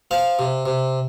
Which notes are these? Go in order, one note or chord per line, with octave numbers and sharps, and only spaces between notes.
F3 F5
C3
C3